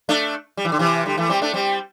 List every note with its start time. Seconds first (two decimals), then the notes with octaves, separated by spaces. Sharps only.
0.09 A3 D4
0.57 G3
0.65 E3
0.72 D3
0.79 C3 E3
1.05 D3 G3
1.17 E3 A3
1.29 G3 C4
1.42 A3 D4
1.54 G3 C4